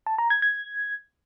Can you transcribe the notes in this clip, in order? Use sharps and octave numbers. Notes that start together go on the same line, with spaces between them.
A5
A#5
G#6
G#6